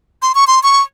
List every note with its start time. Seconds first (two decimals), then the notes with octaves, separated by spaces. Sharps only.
0.22 C6
0.35 C#6
0.47 C6
0.63 C#6